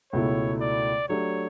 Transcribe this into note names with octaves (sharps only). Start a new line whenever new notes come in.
C#2 B2 A3 E4 C#5
D5
F#3 A3 D4 G4 C#5